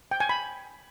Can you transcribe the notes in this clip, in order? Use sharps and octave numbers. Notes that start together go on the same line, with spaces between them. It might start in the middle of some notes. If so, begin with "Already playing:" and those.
G5
G#5
B5